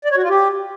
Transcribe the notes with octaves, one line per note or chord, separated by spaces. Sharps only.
D5
C#5
F#4
F4
G4